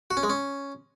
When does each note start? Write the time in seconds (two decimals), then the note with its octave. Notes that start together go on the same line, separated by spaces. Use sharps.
0.11 F#4
0.17 C#4
0.23 G#3
0.30 C#4